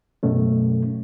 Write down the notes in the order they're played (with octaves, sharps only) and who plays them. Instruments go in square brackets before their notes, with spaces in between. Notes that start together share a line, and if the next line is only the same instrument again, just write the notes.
[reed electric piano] F#2 B2 A3 C#4